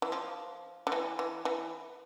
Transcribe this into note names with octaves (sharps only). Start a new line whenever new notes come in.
E3
F3
D3
E3
E3
E3